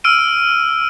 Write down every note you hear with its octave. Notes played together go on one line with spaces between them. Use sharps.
E6 F6 D7 D#7